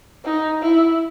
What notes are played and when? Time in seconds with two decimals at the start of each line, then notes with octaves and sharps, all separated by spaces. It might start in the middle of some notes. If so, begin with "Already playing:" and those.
0.25 D#4
0.63 E4